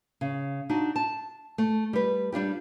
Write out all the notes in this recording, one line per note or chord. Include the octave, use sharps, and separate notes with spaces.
C#3
D4 D#4 F#4
A5
A3
G3 B4
G3 D4 F4 G4